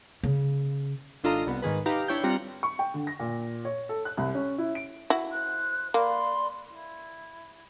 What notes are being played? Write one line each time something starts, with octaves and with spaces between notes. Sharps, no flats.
C#3
G#1 D4 F4 A4 D#5 A#5
C2 B3
G#2 D#3 G#4 B4
D#4 G4 B4 F5 A#5
D4 E4 C#5 G5 G6
G3 C4 F4 A#5 F#6 C#7
C#6
G5
D3
A#6
A#2
C#5
A4
F#6
C2
C#4
E4
D7
E4 F#4
C5 F#6
A#3 D5 B5 C6
E4